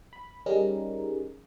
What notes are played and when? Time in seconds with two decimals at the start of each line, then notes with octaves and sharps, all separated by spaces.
0.13 B5
0.46 G3 C#4 D#4 G#4 A#4